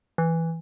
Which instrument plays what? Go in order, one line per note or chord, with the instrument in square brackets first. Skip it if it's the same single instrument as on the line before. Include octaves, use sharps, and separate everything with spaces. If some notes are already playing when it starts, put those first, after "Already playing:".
[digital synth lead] E3